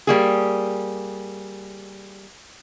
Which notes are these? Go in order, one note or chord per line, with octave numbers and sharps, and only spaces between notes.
G3 A#3 G#4